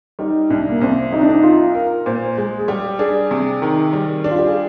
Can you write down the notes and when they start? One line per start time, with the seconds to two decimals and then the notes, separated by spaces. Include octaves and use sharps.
0.19 G3 D#4
0.50 C2 D4
0.69 A#3
0.81 C2 C4
1.12 C3 D#4
1.21 D4
1.29 D#4
1.43 D#4 F4
1.75 A#4
2.06 A#2 C5
2.37 G#3 G#4
2.59 G#4
2.68 G3 G4
2.99 D4 G#4
3.31 C3
3.62 D#3
3.93 G3
4.24 D4
4.31 F4
4.39 G4
4.47 G#4